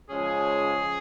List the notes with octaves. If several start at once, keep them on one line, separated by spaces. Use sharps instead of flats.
C#3 F3 G#3 C#4 G#4